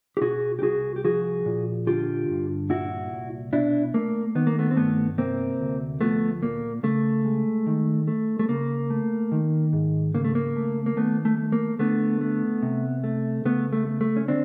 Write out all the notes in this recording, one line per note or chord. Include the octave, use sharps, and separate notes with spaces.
G4
B2 F#4 G#4
G4
C2 F#4 G#4
G4
F3 F#4 G#4
A#2
D3 F4 G4
G2
A#2 E4 F#4
C2
B2 D4 E4
A3 A#3
D#3 B3
A#3
A3 B3
C4
G2 A3 B3
C3 A#3 C4
D2
F3 A3 B3
A#2 A#3
C#3 A3
G#3
D#3
A3
A3
C#3 A#3
A3
D#3
G#2
C#3 A#3
A3
A#3
A3
A#3
D#3 A3 B3
A3
A3
A#3
D3 A3 B3
A3
C3
A3
C#3 A3 B3
A3
A3
A3
C#4
D3 C4 D4